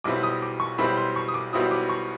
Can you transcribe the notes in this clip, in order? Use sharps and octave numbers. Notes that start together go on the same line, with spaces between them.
B1 B2 G3 C4 E4 D6
D#6
D6
C#6
B1 B2 G3 C4 E4 B5
C6
C#6
D#6
D6
B1 B2 G3 C4 E4 D#6
D6
C#6